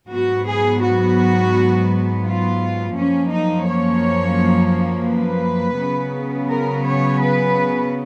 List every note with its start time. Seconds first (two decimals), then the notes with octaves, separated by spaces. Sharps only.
0.11 G#2 F#3 B3 F#4
0.46 G#4
0.81 F#4
2.24 F4
2.94 F#2 F3 A#3 C#4
3.30 D#4
3.65 C#5
5.08 B4
5.78 C#3 F#3 B3
6.49 A#4
6.85 C#5
7.20 B4